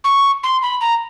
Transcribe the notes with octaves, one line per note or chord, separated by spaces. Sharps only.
C#6
C6
B5
A#5